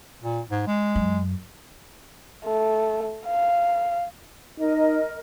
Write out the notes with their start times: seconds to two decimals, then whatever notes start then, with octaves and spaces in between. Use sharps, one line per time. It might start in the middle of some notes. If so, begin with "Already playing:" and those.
0.23 A#2
0.51 G#2
0.67 G#3
0.95 F#2
2.45 A3
3.27 F5
4.60 D#4 A#4 D#5